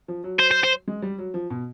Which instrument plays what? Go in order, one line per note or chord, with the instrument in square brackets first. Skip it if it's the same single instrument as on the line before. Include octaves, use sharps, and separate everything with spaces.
[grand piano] F3
F#3
[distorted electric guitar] C5
C5
C5
[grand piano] G#3
G3
F#3
F3
B2